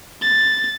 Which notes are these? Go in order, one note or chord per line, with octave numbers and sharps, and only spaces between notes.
A6